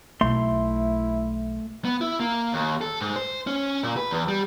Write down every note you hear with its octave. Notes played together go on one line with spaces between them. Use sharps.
B1 A3 E4 C6
B3
E4
A#3
D#2
A4
G#2
C5
C#4
A#2
B4
E2
G3